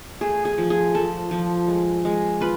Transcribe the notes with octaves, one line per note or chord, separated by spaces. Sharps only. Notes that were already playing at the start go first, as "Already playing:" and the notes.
A3 G#4
G#4
F3
G#4
F3 A4
F3
G#3
G#3
F4 B4